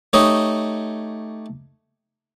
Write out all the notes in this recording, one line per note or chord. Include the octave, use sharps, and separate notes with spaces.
A3 D#4 G4 C#5 D#5